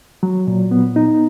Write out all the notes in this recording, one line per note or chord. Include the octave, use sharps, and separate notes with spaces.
F#3
A#2
B3
D#4